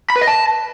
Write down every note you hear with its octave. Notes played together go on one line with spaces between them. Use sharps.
B5
B4
D#5
A5